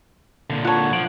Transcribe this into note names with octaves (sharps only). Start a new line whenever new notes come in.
A#2 D3
F4 C#5 F#5 A5
F3 D7 F#7